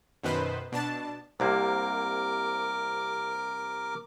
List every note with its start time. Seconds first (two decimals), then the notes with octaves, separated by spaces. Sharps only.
0.23 F#2 B2 D#3 B4 C5
0.72 B2 D4 A5
1.40 C2 C3 A#3 A#4 D6